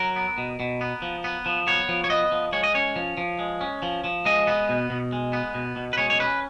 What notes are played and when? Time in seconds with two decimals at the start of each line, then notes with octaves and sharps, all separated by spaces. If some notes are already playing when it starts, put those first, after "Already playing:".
Already playing: F#3 A#4
0.16 B3
0.38 B2
0.60 B2
0.81 B3
1.02 F3
1.24 B3
1.46 F3
1.67 B3 C#5
1.89 F3
2.04 C#5
2.10 B3 D#5
2.32 F3
2.53 G#3 C#5
2.64 D#5
2.75 C#4 C#5
2.96 F3
3.18 F3
3.39 G#3
3.61 C#4
3.82 F3
4.04 F3
4.26 G#3 D#5
4.47 B3
4.69 B2
4.90 B2
5.13 G#3
5.33 B3
5.54 B2
5.76 B2
5.93 B4
5.98 G#3 C#5
6.10 C#5
6.20 C#4 B4